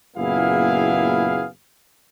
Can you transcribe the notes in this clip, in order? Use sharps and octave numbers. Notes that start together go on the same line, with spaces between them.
F#1 A#2 B3 E4 G#4 F5